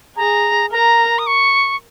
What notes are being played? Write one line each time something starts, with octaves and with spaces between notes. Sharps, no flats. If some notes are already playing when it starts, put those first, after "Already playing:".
G#4 A#5
A#4 A#5
D#6
C#6